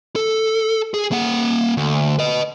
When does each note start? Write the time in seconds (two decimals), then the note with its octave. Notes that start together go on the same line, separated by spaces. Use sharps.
0.16 A4
0.94 G#4
1.12 A#3 F#5
1.77 D2
2.19 B4 D#5